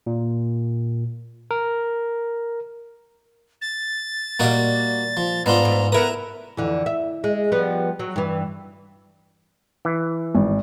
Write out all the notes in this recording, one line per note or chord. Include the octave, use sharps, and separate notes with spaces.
A#2
A#4
A6
A#2 G3 A#3 F#4 D#5
F3
G#2 B3 D4 F4 A#5
G#2
B3 E4 A#4 B4 A#5 D#6
F2 D3 E3
E5
G#3
F3 G3 B3
F#3
G2 E3
E3
G#1